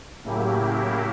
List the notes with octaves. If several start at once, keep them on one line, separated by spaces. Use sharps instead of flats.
A2 C#3 F#3 A#3 E4 G4